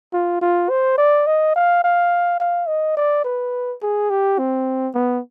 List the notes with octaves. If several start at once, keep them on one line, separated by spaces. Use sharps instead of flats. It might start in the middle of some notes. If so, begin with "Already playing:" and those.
F4
F4
C5
D5
D#5
F5
F5
F5
D#5
D5
B4
G#4
G4
C4
B3